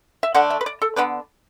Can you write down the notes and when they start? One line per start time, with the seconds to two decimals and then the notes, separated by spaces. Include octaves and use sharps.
0.23 E5
0.34 D3 A3 D4 F#5
0.50 E5
0.61 B4
0.66 D5
0.82 A4
0.96 D3 B3 D4 B4